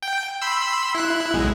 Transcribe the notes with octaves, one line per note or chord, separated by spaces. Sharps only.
G5
B5 C6 E6
E4 F#6
B1 G#3